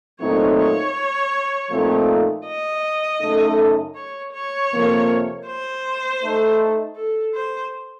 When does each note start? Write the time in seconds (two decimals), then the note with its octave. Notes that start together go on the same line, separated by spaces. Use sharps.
0.19 A#2 F#3 A3 C4 D#4 C#5
0.57 C#5
1.71 A#2 F3 A3 C4 D#4
2.46 D#5
3.21 F#2 C#3 A3 D#4 A4
3.96 C#5
4.33 C#5
4.71 F2 C3 F3 A#3
5.46 C5
6.21 A3 D#4 A4
6.96 A4
7.34 C5